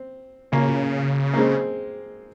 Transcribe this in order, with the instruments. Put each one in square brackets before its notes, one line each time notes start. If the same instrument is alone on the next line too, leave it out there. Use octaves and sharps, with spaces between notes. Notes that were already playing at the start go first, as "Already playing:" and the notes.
Already playing: [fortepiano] C4
[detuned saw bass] C#3 [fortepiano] A#3 C#4
[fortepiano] A#3
G#3 C4